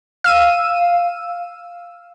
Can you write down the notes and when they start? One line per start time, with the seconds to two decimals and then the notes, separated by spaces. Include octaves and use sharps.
0.24 F5 E6 D#7